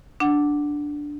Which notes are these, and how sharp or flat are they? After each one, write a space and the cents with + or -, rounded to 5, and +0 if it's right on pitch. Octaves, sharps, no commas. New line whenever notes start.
D4 +0 F#5 +0